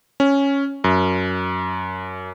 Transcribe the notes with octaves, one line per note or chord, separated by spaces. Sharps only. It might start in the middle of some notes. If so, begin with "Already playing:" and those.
C#4
F#2